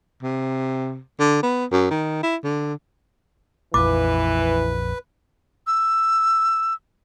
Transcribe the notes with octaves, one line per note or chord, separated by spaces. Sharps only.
C3
D3
B3
F#2
D#3
E4
D3
A#1 F2 E3 B4 D6
E6